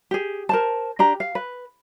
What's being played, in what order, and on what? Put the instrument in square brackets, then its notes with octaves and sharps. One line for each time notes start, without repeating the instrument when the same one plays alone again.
[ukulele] G4 G#4
A#4 C5 A5
D4 G4 A#5
F5
B4